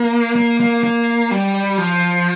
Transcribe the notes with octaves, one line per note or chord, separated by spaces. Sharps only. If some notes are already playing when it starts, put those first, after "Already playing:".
Already playing: A#3
A#3
A#3
A#3
G3
F3